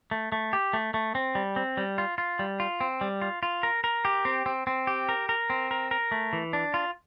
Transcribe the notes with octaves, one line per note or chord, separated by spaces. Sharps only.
A3
A3
G4
A3
A3
C4
G3
C4
G3
F4
F4
G3
F4
C4
G3
F4
F4
A#4
A#4
G4
C4
C4
C4
G4
A#4
A#4
C4
A#4
A#4
A3
E3
D4
F4